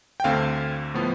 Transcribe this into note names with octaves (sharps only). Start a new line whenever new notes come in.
G5
D2 D3 A3 C4 F5
A2 F3 B3